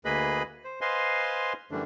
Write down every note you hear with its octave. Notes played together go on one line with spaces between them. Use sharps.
D2 A#3 G#4 B4 D#5 B5
C5
B4 C5 D#5 F5 G#5 C6
F#2 D3 E3 G3 A3 D4